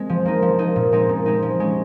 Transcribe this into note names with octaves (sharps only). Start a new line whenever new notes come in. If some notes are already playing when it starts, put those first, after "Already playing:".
Already playing: G#3 C4
F3
A#3 D#4
F3
A#3 D#4
A#2
G#3 C4 D#4
A#2
G#3 C4 D#4
F3
G#3 C#4